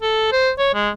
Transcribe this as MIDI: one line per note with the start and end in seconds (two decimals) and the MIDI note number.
0.02 0.31 69
0.32 0.51 72
0.59 0.70 73
0.74 0.90 56